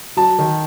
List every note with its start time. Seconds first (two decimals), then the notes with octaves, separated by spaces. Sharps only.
0.17 F#3 A5
0.39 D#3